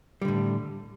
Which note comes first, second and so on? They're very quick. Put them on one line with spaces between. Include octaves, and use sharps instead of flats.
G3 D3 A2